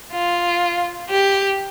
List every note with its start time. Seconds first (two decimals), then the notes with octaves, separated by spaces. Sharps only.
0.12 F4
1.10 G4